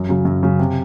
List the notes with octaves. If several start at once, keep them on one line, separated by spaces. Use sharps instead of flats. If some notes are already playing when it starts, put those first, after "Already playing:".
Already playing: F#2
C#3 F#3
F#2
C#3 F#3
C3